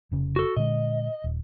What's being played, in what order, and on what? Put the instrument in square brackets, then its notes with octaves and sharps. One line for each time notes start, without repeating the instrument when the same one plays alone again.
[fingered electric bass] F1 C#3
[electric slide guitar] F#4 A4
[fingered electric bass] A#2 D3 G#3 [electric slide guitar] D#5
[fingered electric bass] D#1